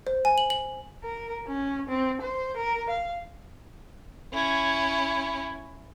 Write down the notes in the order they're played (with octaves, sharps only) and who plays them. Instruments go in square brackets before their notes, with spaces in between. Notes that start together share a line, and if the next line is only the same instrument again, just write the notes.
[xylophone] C5
G#5
F#7
F#7
[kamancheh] A#4
C#4
C4
C5
A#4
F5
[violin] C#4 E4